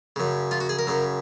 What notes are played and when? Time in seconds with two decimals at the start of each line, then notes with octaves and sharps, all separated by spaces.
0.16 F#2 C#3
0.51 F4
0.60 F#4
0.69 G#4
0.79 A#4
0.87 F#2 C#3